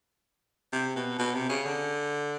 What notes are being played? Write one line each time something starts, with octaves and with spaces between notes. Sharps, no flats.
C3
B2
B2
C3
C#3
D3